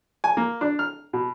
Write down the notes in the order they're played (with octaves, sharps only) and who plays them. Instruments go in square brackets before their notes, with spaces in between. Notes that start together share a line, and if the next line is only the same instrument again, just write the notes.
[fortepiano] G#5
A#3
D4
F6
B2